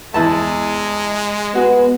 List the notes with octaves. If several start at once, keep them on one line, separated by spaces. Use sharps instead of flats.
E2 G#3 E4 A5
B3 F#4